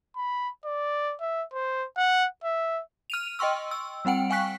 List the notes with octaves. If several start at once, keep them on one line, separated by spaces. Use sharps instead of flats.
B5
D5
E5
C5
F#5
E5
F6 D#7 F7
D#5 G5 C6 C#6 E6
E6
G3 C4 F#5 G5 D7
F5 G5 G#5 C#6 F#6 B6